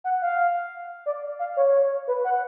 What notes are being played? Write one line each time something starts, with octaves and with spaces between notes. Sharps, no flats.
F#5
F5
D5
F5
C#5
C#5
B4
F#5